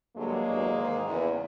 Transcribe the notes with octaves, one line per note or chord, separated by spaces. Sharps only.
G2 D3 F#3 G#3 A#3
E2 B2 F#3
G#2 D#3 G#3
E2 C#3 E3